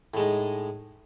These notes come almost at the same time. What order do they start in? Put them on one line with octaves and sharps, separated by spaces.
A2 G#3 D#4